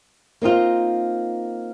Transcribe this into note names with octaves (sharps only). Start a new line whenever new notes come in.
A#3 C4 D#4 F4